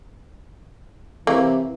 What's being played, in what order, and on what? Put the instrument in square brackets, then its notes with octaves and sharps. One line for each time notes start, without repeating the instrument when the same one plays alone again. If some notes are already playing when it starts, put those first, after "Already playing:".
[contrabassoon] C3 [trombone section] E3 [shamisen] A#3